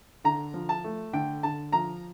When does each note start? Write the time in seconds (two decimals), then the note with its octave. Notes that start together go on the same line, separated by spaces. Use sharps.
0.24 D3 A#5
0.54 F3
0.69 A5
0.84 A3
1.13 D3 G5
1.43 D3 A5
1.72 F3 A#5